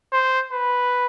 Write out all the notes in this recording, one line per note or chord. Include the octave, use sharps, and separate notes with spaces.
C5
B4